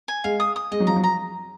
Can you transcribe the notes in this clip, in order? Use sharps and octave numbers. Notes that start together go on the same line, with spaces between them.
G#5
G#3 F5
D#6
D#6
G#3 D#5
F#3
F3 A#5
F#3
A#5